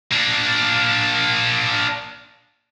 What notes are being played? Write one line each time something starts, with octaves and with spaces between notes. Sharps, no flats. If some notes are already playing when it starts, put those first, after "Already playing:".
A#3 D4